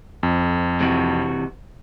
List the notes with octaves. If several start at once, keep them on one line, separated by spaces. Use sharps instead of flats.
F2
C3 E3 F#4